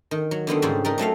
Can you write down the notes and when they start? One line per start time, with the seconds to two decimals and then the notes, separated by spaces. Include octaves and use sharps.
0.11 D#3
0.31 F#3
0.47 D3 D#3 B3 C4
0.62 G#2 C#3 G3 C4
0.85 G3 D#4 A#4
0.98 F#3 A3 E5 F5